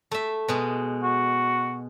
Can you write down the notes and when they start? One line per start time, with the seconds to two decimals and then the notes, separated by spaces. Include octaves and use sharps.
0.11 A3 E5
0.48 B2 G#3
1.03 F#4